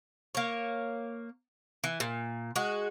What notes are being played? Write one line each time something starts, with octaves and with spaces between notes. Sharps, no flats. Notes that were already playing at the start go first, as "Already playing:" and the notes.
A#3 C#5
E3
A#2
G#3 F#4